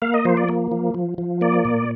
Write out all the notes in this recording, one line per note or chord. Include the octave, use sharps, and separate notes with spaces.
A#3 F5
D#5
F3 C5
D5
A#3
F3
F3
F3
A#3 D5
A#2